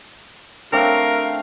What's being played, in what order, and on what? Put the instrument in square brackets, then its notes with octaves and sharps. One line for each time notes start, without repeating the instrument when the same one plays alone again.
[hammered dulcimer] A3 C4 D4 [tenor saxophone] A#4 [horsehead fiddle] F5